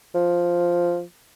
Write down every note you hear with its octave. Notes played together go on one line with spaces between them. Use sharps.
F3